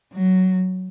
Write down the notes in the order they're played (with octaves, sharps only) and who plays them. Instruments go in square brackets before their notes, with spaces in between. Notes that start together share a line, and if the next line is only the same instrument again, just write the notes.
[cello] F#3